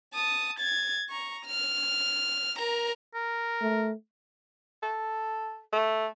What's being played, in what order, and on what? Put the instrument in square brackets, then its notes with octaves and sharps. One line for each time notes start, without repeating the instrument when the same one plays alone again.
[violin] A5 D#6
G#6 A6
A#5 C#6
F6
A#4 A#5
[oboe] A#4
[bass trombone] A3
[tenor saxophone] A4
A3